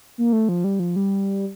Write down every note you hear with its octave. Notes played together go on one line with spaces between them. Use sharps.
A#3
A3
F3
G3
F3
G3